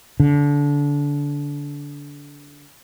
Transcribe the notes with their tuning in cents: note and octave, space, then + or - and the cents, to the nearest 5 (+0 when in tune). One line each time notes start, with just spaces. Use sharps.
D3 -25